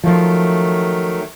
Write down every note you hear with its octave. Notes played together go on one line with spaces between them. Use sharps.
D#3 F3 F#3 A3